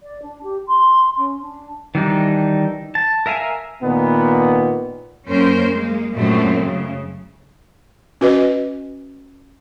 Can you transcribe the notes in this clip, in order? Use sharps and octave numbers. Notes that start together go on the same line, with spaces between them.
D5
D4
G4
C6
C#4
D4
D#3 E3 G3 D4 D#4
A5
A#4 E5 F5 G#5
A#2 D#3 B3
F#2 A#3 C#4 A#4 C5
G#3 A#3
F#2 A#2 F#3 G#3 A3 C4
C#3
C#4 F#4 B4 D#5